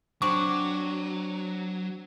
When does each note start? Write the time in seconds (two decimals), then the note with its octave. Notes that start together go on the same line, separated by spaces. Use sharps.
0.22 F#3 C4 D4 F#4 C#6